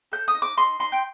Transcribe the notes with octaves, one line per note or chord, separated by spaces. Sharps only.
A4 G6
D#6
D#4
D6
D#4 C6
D#4 C6
G5